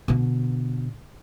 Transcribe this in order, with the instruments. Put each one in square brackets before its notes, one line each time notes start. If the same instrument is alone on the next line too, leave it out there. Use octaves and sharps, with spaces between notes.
[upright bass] B2 D3